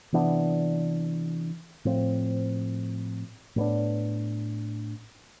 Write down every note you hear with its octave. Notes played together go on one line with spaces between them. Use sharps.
C3 E3 B3 D4
A2 F3 C4
A2 G3 B3 D4